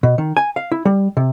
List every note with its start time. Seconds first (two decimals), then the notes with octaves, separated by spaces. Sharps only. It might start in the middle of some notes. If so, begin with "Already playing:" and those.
0.03 B2
0.18 D#3
0.37 G#5
0.56 F5
0.72 E4
0.85 G3
1.17 C3